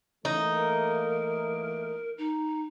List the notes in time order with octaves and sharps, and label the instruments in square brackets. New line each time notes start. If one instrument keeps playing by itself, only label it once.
[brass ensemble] E3 A3 A#3 [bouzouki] D#4
[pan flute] A#4
D#4